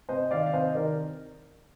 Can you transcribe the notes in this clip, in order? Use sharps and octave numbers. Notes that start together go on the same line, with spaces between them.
C3 C5 D#5
D#3 D5 F5
F5
C3 C5 D#5
D#5
D#3 A#4 D5